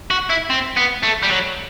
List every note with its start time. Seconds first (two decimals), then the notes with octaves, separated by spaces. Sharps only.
0.10 F#4
0.30 E4
0.50 C4
0.77 B3
1.03 A3
1.23 G3
1.30 F#3